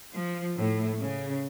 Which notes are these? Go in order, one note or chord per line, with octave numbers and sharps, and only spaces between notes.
F3
A2
C#3